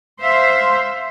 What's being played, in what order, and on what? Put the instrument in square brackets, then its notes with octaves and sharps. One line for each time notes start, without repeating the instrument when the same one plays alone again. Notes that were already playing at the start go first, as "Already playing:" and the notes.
[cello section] C5 E5 F5